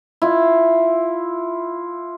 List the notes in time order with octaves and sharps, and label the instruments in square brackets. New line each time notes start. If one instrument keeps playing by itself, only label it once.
[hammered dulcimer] E4 F4